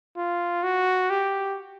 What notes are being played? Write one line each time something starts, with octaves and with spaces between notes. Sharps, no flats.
F4
F#4
G4